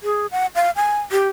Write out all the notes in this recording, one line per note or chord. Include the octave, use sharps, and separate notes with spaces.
G#4
F#5
F5
G#5
G4